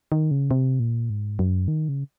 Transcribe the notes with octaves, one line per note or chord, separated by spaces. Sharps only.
D#3
C#3
C3
A#2
G#2
F#2
D#3
C#3